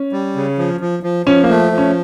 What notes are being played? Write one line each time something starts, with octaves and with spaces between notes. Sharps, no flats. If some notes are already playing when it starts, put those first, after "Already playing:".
Already playing: C#4
G3
C#3
F3
F3
F3
F3 C#4
A#3
A3
F3
C#4